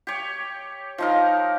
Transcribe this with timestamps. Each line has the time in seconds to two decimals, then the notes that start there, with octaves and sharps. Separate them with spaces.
0.07 G4 C#5
0.98 F3 D#4 A#4